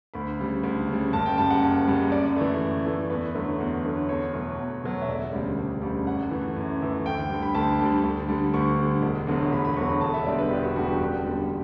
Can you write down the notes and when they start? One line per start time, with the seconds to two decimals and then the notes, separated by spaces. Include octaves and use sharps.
0.14 D2 B5
0.39 C#3 G3
0.63 D2
0.88 C#3
0.93 G3
1.13 F#1 A5
1.26 G5
1.38 F#2 C#3 G3 A5
1.50 F#5
1.62 F#1
1.88 F#2 C#3 G3
2.12 F#2 D5
2.36 E3 A3
2.61 F#2
2.86 E3 A3
3.10 E2 B4
3.34 D3 F#3 A3
3.60 E2
3.85 D3 F#3 A3
4.09 E2 C#5
4.34 B2 F#3 A3
4.58 E2
4.84 B2 F#3 A3
5.02 E5
5.08 E1 D5
5.32 D2 C#3 G3
5.58 E1
5.82 D2 C#3 G3
6.06 F#2 F#5
6.31 E3 A3
6.56 F#2
6.81 E3 A3
7.05 D2 G5
7.30 D3 G3
7.43 B5
7.54 D2 A5
7.80 D3 G3
8.04 D2
8.29 D3 G3
8.54 D2 C#6
8.79 D3 G3
9.02 E1
9.27 E2 D3 F#3 A3
9.52 E1 B5
9.65 B5
9.76 E2 D3 F#3 A3 C#6
9.89 B5
10.01 E1 A5
10.14 E5
10.26 E2 D3 G3 D5
10.38 B4
10.50 E1 G4
10.63 F#4
10.75 E2 D3 G3 F#4
10.88 G4
11.00 F#1
11.24 E2 D3 G3